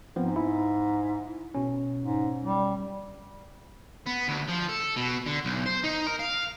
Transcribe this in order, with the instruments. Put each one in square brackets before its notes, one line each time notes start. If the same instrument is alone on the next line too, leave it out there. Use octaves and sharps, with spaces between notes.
[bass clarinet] G#2 [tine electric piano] F3 B3 C4
[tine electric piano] E4
B2 C#4
[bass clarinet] G#2
G3
[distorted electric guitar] B3
D2
F3
A4
B2
D3
B1
C5
D#4
A#4
F5